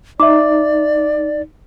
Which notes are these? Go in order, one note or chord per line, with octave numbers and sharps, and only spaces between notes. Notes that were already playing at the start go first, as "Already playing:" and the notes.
D#4 D5 E5 D6